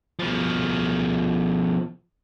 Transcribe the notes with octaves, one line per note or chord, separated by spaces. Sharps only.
B2 F3